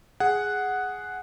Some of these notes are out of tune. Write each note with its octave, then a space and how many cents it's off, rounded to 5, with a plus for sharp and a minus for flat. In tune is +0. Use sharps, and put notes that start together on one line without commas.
G#4 +0 F#5 +0